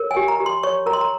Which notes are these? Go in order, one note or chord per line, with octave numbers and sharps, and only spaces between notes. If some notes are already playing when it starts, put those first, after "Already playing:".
Already playing: A#4 C#5
G#5
G4
A#5
G4
C6
C#5 C#6
A#4 A#5
C6
A#5